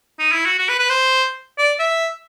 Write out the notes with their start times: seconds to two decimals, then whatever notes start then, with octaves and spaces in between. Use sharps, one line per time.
0.19 D#4
0.32 E4
0.45 F#4
0.59 F#4
0.69 B4
0.79 B4
0.89 C5
1.58 D5
1.79 E5